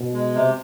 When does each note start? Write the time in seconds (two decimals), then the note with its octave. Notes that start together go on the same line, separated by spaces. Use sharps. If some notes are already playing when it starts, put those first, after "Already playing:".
Already playing: B2
0.14 G#3
0.34 C3